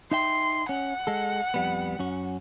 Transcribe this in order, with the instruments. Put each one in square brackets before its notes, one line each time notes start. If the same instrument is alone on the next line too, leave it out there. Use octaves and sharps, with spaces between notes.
[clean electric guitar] D#4 E5 G5 [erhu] C6
[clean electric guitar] C#4 [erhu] F#5
[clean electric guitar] G#3 A4
F2 G3 B3
F#2 C#4 F#4